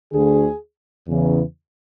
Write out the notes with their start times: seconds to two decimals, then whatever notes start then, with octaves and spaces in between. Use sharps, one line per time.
0.13 D2 D3 G#4
1.07 E2 C#3 E3